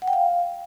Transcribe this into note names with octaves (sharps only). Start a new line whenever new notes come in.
F#5
G5
F5